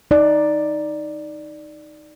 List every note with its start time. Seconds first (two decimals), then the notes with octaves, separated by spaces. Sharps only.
0.11 D#4 D5